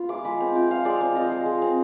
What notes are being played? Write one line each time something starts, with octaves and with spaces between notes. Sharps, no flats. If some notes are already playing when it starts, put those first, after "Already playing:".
Already playing: B3 F4
G#3 D6
G#3 B5
C4
F4 G5
G#3 F5
G#3 D5
C4 C5
F4 D#5
G#3
G#3
C4